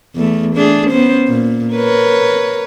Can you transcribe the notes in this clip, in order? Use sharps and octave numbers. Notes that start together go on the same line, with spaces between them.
E2 A3
A3 D4 G#4
B3 C#4 C5
A#2
A#4 B4 C#5